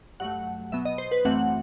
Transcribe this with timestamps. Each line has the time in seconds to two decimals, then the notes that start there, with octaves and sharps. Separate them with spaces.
0.20 G2 F#3 A3 F#5
0.72 B2 F#3 B3 E5
0.85 D#5
0.98 C5
1.12 B4
1.25 F#2 E3 A3 C4 F#5